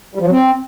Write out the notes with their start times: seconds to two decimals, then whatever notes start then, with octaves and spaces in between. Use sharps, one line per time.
0.15 G3
0.20 F3
0.26 F#3
0.31 C4